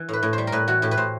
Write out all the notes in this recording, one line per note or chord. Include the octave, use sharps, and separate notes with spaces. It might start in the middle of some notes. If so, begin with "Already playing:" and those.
Already playing: E3
A2 B4
A2
C5
G3
A#4
A2 B4
E3 F#4
A2 G4
B4
A2 C5